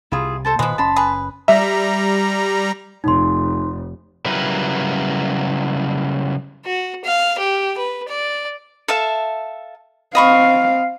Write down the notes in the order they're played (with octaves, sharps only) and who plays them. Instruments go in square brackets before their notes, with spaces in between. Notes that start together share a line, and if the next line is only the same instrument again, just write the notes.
[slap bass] C2 C3 [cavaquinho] E4 F4 G#4
[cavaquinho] A4 C5 A5
[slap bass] A#2 D#3 [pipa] F3 G#3 [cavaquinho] B4
[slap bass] F#1 C#4 [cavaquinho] A5 B5 C6
[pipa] G#4 B4
[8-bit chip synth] G3 A#5 [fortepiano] E5
[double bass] F1 [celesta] D#4 C6
[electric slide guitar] C#3 F#3 G3 E4 A#4 B4
[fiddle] F#4
F5
G4
B4
D5
[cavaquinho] A4 E5 F5
[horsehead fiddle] C4 F5 [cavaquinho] D#5 B5 C#6